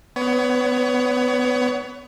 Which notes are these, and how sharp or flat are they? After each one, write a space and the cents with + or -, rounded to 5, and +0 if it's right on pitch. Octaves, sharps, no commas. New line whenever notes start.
B3 +20 C#5 +30